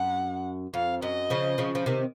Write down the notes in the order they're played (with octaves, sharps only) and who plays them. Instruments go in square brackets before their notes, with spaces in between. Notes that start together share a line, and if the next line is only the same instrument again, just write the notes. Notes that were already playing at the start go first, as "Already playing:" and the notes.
Already playing: [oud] F#2 [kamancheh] F#5
[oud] F2 [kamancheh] F5
[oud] F#2 [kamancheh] D#5
[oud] C#3 F3
C#3 F3
F3
C3 D#3